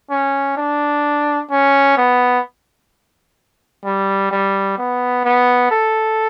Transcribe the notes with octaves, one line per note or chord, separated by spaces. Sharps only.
C#4
D4
C#4
B3
G3
G3
B3
B3
A4